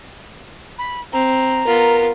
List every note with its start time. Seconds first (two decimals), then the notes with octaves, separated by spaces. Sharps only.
0.78 B5
1.12 C4 A#5
1.66 B3 F4 A#4